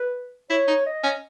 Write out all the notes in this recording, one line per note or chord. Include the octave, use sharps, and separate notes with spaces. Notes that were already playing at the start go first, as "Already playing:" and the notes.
Already playing: B4
E4 C#5
D#4
D#5
C#4